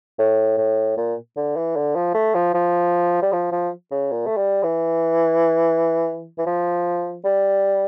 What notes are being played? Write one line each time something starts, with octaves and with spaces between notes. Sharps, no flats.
A2
A2
A#2
D3
E3
D3
F3
A3
F3
F3
G3
F3
F3
C#3
A#2
A3
G3
E3
E3
F3
G3